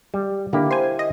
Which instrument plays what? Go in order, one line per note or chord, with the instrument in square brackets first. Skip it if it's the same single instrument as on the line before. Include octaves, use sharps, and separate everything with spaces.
[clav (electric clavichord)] G3
[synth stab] D3 [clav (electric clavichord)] A#3 E4 G4
[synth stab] C5 G#5
D#5